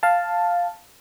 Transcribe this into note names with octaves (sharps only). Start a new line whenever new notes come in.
F5 A5